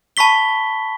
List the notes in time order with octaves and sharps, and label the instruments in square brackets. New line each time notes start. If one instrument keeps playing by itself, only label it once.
[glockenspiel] A5 B5 C#6 B6 G7